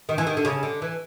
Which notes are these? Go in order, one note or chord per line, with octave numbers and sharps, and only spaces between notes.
D#3
E3
D#3
D3
C#3
D3
E3